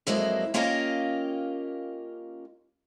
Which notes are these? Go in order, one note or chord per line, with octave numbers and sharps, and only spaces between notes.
F2 F#3 G#3 A#3 E4
A#3 C#4 F4 G4 A#4 D#5